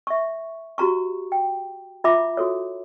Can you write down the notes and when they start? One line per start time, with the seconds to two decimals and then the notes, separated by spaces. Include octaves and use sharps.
0.07 E5 C#6
0.78 F#4 G4 A#5 C#6
1.32 G5
2.04 F4 E5 A#5 B5 D6
2.37 F#4 A4 C#5